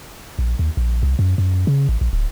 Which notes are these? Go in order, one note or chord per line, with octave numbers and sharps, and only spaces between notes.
A#1
D#2
A#1
C2
F#2
F#2
C#3
A1
A#1
D1